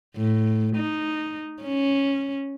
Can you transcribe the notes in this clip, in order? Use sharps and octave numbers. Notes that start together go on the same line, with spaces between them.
A2
D#4
C#4